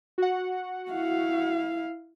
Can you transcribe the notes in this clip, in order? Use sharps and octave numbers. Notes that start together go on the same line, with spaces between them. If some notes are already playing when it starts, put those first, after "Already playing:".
F#4 F#5
E4 F5